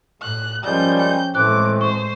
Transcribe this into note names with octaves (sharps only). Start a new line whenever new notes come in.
A2 F#6
A#2 F3 G3 G#3 C#4 G6
G5 G6
A2 E3 G#3 A3 C4 D6 F#6
C5 C#6